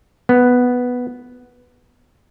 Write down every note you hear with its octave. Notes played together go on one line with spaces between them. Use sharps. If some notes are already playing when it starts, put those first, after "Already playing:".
B3